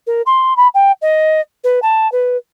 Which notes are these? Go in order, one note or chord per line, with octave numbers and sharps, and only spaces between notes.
A#4
C6
B5
G5
D#5
B4
A5
B4